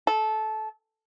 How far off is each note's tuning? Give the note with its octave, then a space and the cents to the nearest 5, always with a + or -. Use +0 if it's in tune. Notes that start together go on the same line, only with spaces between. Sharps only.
A4 -20